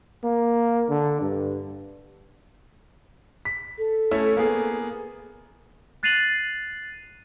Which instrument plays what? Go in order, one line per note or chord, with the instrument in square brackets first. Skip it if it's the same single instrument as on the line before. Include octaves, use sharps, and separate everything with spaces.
[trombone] A#3
D3
G2
[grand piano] B6
[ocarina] A4
[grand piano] A3 C#4 E4
A#3 B3 G#4
[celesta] F#6 A6 C7 D#7 F7 F#7